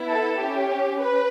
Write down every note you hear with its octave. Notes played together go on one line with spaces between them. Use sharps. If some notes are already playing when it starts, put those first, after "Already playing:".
Already playing: B3 E4
A4
C#4 G4
B4